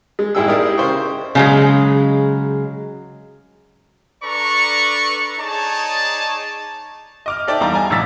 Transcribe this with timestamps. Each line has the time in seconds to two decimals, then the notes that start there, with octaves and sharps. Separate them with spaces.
0.19 G#3
0.35 A1 G#3 E4 G#4 G5 E6
0.48 D#4 E4 G4 G#4 A#4 D5
0.78 C#3 C5 G5 C#6
1.35 C#3 F#3 G#3
4.23 D4 A4 B4 D5 A#5 C#6
5.38 D#4 G#4 C#5 D5 A5
7.26 D#5 D6 F6
7.47 D#4 A4 C5 D5 E5 G5
7.61 E2 G3 D#4 F5 A#5 D6
7.73 G#5 A#5
7.90 A1 F#2 D3 E6 A6 B6